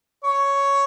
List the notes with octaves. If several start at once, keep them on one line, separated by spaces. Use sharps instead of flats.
C#5